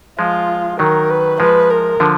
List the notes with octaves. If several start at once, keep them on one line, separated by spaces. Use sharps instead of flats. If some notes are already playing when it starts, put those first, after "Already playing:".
F3 G#3 F4
D#3 F#3 A#4
B4
F3 G#3 B4
A#4
D3 F3